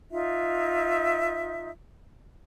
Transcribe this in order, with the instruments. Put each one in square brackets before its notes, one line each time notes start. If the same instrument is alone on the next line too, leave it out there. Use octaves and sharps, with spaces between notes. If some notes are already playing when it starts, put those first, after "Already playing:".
[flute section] D#4 F4 E5